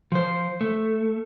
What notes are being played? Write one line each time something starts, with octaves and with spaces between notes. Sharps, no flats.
F3 C5
A3